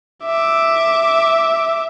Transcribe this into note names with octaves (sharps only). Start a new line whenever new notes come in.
E5 D6